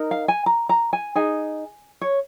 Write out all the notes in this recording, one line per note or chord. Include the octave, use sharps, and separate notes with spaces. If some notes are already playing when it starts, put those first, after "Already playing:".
Already playing: D#4 A#4
F5
G#5
A#5
A#5
G#5
D#4 G#4 G#5
C#5